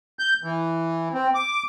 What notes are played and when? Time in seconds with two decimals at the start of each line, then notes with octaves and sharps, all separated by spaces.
0.19 G6
0.43 E3
1.14 C4
1.35 D6